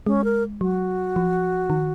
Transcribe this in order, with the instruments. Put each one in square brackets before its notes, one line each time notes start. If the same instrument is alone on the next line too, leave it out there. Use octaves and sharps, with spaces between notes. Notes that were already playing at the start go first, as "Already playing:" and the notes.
[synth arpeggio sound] G#3 [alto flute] C#4
[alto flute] A#4
[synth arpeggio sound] F#3 [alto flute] F#4
[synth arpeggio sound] F3
D#3